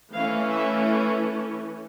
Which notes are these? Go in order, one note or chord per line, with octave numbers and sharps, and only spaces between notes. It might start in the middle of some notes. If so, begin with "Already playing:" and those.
E3 A3 C#4 F5
E5